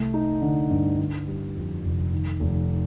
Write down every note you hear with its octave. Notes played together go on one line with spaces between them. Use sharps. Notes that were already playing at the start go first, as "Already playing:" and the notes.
Already playing: C2 A3
D#4
D3
G2
D3
G3
F2
F1
D#3
F1